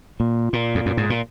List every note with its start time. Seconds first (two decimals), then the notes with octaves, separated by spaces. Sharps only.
0.20 A#2
0.53 A#2
0.75 F2
0.86 F#2
0.97 G#2
1.10 A#2